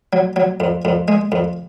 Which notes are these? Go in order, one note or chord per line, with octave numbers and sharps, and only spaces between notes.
F#3
F#3
F2
F2
G#3
F2